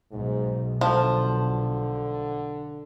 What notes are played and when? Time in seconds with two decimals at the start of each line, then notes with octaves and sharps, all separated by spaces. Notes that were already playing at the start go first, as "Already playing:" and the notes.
0.11 B1 G#2
0.81 D3 F3 A5